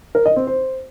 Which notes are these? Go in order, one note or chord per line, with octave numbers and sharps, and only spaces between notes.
A#4
D#5
C4
C5